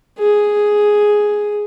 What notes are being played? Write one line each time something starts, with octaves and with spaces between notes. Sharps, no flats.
G#4